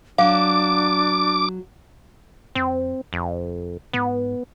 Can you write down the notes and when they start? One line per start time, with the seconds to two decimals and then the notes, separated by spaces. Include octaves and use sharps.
0.18 F#3 D4 F5 D6
2.55 F2 C4
3.13 F1 F2
3.93 G#2 B3